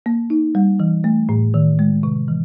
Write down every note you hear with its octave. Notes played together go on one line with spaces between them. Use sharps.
A#3
D#4
G3
E3
A3
A2
D#3
G#3
C3
E3